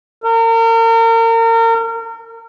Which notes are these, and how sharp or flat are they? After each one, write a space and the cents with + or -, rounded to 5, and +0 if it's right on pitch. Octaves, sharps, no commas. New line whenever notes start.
A#4 -35